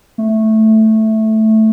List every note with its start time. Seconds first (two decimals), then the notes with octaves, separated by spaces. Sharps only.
0.18 A3